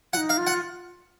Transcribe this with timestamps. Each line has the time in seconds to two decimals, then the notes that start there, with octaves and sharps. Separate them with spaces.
0.13 F4 F#5
0.17 D#4
0.29 F5
0.38 F4
0.47 F#5